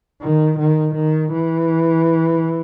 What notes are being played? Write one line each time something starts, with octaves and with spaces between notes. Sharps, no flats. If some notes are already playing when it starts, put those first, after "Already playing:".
D#3
D#3
D#3
E3